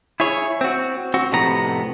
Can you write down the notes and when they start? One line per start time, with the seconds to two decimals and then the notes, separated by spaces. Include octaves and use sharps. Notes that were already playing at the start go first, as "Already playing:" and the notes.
0.20 E4 G#4 C#5
0.61 C4 F#4
1.14 C4 F#4
1.32 F2 A2 C3 B3 A#5